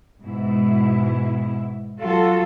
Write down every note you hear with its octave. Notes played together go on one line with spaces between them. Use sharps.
G#2 B2 E4
F#3 F4 F#4 A4